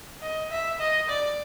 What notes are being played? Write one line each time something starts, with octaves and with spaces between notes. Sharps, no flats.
D#5
E5
D#5
D5